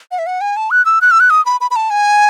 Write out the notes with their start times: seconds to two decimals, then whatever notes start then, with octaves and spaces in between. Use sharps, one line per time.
0.12 F#5
0.19 E5
0.27 F#5
0.41 G#5
0.57 A5
0.71 F#6
0.86 E6
1.01 F#6
1.11 E6
1.20 F#6
1.30 D#6
1.46 B5
1.61 B5
1.71 B5
1.76 A5
1.90 G#5